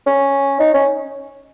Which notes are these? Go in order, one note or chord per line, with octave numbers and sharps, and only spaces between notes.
C#4
D#4
C#4